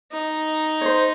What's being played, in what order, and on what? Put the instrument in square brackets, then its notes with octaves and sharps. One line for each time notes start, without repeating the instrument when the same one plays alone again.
[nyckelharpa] D#4
[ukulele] C#5
C5